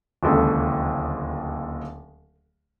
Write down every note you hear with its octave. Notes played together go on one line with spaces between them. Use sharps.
D1 D#2 C#3 G#3 D4 A4